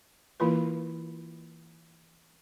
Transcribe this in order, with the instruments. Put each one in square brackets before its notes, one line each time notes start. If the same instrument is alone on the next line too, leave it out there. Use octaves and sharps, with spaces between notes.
[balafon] E3 A#3 E4 F4 B4